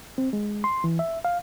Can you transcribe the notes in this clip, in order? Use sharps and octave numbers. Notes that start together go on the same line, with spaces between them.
C4
G#3
C6
E3
E5
F5